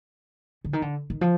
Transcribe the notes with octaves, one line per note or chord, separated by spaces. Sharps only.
D3
D#3
D3
D#3
F3